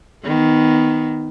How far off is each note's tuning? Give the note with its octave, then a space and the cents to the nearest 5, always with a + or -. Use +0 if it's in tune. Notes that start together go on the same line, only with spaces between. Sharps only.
D#3 +0 B3 +15